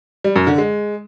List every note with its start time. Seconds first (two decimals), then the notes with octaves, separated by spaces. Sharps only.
0.24 G3
0.36 F#2
0.47 D3
0.58 G#3